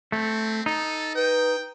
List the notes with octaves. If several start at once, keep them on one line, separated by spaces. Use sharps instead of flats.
A3 C4
D#4 A4
B4 G5